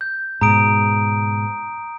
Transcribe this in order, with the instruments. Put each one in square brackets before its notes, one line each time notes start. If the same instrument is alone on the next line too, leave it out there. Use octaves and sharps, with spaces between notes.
[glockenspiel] G6
[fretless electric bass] G#2 B2 [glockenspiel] A#5 D#6 D7